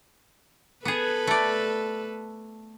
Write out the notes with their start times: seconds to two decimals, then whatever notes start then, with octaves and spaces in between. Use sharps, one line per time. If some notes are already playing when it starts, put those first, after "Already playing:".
0.85 B3 G#4 A4 B4
1.27 A3 D5